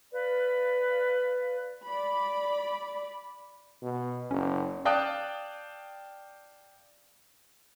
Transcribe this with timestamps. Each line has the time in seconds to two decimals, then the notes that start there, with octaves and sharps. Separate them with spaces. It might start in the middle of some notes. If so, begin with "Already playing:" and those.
0.11 B4 D5 F5
1.86 D5 B5
3.83 B2
4.31 F#1 C#4
4.85 D5 F5 G5 A5 D#6 F#6